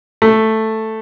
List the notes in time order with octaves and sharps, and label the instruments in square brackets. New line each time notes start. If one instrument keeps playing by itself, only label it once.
[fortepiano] A3